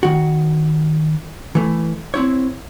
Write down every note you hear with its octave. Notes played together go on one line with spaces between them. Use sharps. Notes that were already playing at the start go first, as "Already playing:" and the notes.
D#3 F#4
E3 A3
C4 E4 C#5